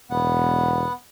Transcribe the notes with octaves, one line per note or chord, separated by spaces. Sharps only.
E1 B3 F#5